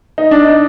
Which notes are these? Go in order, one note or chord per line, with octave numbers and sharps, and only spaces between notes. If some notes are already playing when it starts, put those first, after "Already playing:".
D#4
D4
D#4